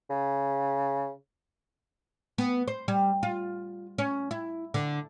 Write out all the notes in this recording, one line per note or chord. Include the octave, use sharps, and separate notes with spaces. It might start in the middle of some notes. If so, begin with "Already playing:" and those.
C#3
B3
C5
G3
F4
C#4
E4
D3